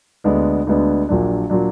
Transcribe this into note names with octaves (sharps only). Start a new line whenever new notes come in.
D2 D3 G#3 B3 D4
D2 D3 G#3 B3 D4
A#1 A#2 F#3 D4
A#2 F#3 D4